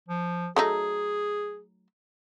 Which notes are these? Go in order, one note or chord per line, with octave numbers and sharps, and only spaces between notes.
F3
F#3 A3 D#4 G#4